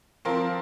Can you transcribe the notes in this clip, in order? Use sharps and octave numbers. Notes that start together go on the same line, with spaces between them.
F3 C4 F4 A#4